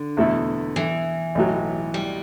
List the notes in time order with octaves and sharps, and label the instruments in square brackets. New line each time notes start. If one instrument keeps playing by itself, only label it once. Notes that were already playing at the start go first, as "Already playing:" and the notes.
Already playing: [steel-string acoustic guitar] D3
[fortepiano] E2 B2 A3 E4 A4
[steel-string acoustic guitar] E3
[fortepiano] B1 A2 F#3
[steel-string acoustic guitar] G3